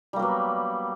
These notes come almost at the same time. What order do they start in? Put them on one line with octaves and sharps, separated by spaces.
G3 A#3 F#3 B3